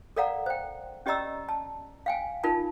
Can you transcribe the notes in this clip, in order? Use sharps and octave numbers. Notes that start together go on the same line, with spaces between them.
A4 A#4 D5 F5 F#5 A#5
C5 G5
C#4 G4 D5 D#5 A#5 E6
A5
F5 G5 G#5
D#4 F4 A#4 A5